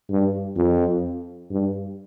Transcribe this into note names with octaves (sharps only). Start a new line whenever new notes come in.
G2
F2
G2